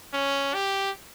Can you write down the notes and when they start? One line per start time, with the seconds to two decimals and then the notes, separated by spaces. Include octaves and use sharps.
0.14 C#4
0.54 G4